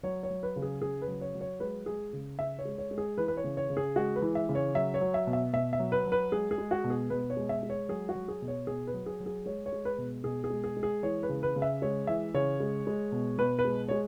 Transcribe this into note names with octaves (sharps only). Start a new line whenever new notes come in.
F#3 C#5
C#5
F#3
B4
C#3
G#4
C#3 G#4
B4
F#3
C#5
F#3
C#5
G#3 B4
G#3 G#4
C#3
C#3 E5
C#5
G#3
C#5
G#3
G#4
E3 B4
B4
C#5
C#3
C#5
C#3
G#4
G#3 F#4
B4
E3
E5
C#3
C#5
F#3 E5
C#5
F#3
E5
B2
E5
B2 E5
E5
F#3
B4
F#3
B4
G#3 G#4
G#4
G#3
F#4
B2
G#4
B2 B4
C#5
G#3
E5
G#3
C#5
F#3 G#4
F#4
F#3
G#4
B2
C#5
B2 G#4
B4
F#3
G#4
F#3
G#4
G#3 C#5
C#5
G#3
B4
B2
B2 G#4
G#4
G#3
G#4
G#3
G#4
E3 C#5
B4
C#3
B4
C#3
E5
G#3 C#5
E3 E5
C#3 C#5
G#3
G#3
B2
B2 B4
B4
G#3
G#3 C#5